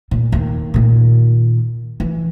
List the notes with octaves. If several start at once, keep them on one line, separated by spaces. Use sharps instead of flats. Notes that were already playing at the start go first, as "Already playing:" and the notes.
A#2
D#2
A#2 D#3
E3